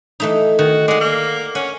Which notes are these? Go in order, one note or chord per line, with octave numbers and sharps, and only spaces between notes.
E3 A3 D#4
D#3 F#4
G#3 D5 F#5
A#3
C#4 F#5